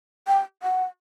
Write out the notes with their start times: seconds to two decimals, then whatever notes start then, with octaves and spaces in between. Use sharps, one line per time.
0.28 G5
0.63 F#5